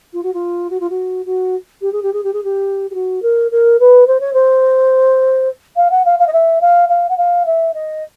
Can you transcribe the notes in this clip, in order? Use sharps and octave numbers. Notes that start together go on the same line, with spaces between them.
F4
F#4
F4
F#4
F4
F#4
F#4
G4
G#4
G4
G#4
G4
G#4
G4
G4
F#4
A#4
A#4
B4
C5
C#5
C5
F5
F#5
F5
F5
D#5
E5
F5
F5
F#5
F5
E5
D#5